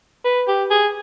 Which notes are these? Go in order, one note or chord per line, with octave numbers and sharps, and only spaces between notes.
B4
G4
G#4